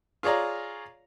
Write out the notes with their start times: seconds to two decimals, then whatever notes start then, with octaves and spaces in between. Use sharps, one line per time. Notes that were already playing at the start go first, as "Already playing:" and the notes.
0.23 F4 G#4 C#5 D5 A#5